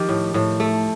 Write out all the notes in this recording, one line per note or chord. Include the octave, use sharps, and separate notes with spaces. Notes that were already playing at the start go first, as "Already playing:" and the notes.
Already playing: D#3 F3 G4
A2
A2
A3